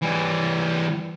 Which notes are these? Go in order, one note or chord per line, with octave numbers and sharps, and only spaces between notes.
E3 G3